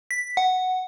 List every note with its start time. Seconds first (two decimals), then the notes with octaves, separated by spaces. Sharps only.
0.11 B6
0.37 F#5